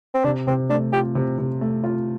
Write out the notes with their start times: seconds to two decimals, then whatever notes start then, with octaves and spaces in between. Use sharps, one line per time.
0.14 C4
0.24 C3 D4
0.47 C3 C4
0.70 A3 D4
0.93 F4 G4
1.15 C3
1.38 C3
1.61 A3
1.84 F4